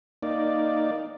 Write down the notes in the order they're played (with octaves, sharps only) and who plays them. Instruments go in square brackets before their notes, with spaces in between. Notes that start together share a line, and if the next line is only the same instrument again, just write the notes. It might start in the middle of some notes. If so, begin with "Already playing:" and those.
[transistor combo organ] A#3 D#4 D5